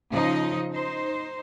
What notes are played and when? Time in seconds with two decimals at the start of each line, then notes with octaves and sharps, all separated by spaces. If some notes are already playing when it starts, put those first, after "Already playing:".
0.12 C#3 F3 D#4 D#5
0.71 D#4 C5